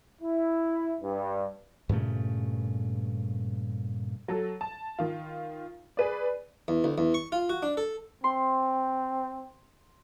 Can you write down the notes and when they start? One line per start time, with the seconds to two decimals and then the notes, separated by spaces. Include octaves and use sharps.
0.22 E4
1.01 G2
1.89 G2 A#2 C#3 A3
4.28 F#3 A4
4.61 A5
4.99 D#3 F4
5.97 G#4 B4 D5
6.68 E2
6.84 D2
6.98 E2
7.14 C#6
7.32 F4
7.49 F#4
7.63 D4
7.77 A4
8.24 C4 C6